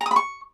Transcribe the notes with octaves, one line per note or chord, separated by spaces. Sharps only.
A#5
D#6
B5
C#6